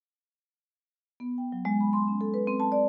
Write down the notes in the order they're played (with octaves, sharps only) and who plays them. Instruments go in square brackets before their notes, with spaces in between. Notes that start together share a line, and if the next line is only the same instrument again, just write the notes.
[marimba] B3
G5
F#3
G#3
B5
C6
C#4
A4
B4
C4
A5
D5